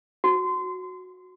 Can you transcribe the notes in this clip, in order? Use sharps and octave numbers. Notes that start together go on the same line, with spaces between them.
F#4